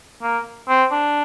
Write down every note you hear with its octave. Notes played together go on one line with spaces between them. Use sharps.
A#3
C4
D4